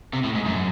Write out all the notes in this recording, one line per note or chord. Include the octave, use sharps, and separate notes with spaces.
C3
A2
G#2
F#2